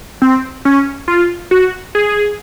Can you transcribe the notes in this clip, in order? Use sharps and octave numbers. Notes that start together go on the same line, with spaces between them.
C4
C#4
F4
F#4
G#4